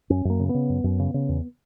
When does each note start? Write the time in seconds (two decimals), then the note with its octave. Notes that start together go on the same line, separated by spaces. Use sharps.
0.10 F#2 C#4
0.25 F#2 A#3
0.40 C#3
0.49 B3
0.54 C#3
0.69 F#2
0.84 F#2
0.99 C#3
1.14 C#3
1.29 E2